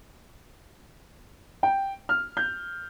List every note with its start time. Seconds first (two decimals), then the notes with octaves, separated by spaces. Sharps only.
1.63 G5
2.09 F6
2.37 G6